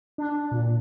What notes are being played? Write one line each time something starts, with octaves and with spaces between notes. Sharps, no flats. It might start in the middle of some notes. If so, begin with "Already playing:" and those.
D4
A#2